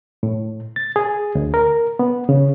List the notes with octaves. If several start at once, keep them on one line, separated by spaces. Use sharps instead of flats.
A2
A6
G#4
D2
A#4
B3
C#3